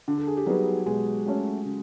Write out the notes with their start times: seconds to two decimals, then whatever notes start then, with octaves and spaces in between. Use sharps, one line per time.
0.08 D3
0.17 A4
0.27 G#4
0.37 G4
0.46 F#3 G3 B3 D#4 F#4 G#4
0.86 B2 G#3 G#4
1.26 F#3 A3 C#4
1.65 C#3